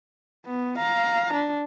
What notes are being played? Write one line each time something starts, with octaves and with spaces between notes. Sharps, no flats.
B3
F5 A#5
D4